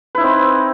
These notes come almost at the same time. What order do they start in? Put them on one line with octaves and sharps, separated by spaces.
B4 E4 D#4 C4